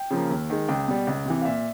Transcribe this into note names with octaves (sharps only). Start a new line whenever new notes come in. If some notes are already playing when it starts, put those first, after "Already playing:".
Already playing: G5
C#3 F3 A#3
D#2
D#3 G#3
C#2 G5
B2 G3
C#2
C3 E3
F5
A#2 E5